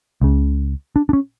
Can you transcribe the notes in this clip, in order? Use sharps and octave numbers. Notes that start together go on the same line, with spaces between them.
C#2 C#3
D4
D4
C#4